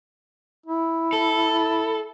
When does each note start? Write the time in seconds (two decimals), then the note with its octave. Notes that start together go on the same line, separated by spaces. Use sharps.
0.66 E4
1.13 A4